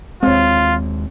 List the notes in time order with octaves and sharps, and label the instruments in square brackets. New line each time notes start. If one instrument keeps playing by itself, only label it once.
[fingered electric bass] D#2 G#3 [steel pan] C4 C#5 [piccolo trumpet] F4